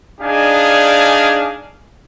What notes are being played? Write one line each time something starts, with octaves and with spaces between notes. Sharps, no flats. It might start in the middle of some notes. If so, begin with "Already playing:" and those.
D4 D#4 G#4 D5 F5 G#5